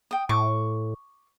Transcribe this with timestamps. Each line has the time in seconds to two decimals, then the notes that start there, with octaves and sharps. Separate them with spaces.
0.11 G5 D#6
0.29 A2 C#6 D6